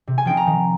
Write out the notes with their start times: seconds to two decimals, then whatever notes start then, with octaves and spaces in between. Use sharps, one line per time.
0.07 C3
0.18 G#5
0.25 F3 C4 D#4 G5
0.37 A#5
0.47 D#3